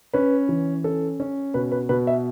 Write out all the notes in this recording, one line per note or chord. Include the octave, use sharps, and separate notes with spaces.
C#4 B4
E3
C#4 A4
C#4
B2 B4
B4
B2 B4
E5